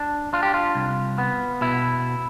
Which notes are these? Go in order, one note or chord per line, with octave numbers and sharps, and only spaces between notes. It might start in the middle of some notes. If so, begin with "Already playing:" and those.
Already playing: D4
D4 F4
G4
F4
C2
B3
B2 E4